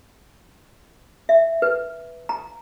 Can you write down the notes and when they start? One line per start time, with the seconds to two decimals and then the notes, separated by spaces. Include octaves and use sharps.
1.29 E5
1.62 B4
2.29 A#5